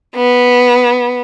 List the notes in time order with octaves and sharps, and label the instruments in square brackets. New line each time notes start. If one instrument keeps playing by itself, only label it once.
[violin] B3